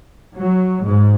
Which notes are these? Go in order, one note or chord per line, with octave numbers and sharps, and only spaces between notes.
F#3
G#2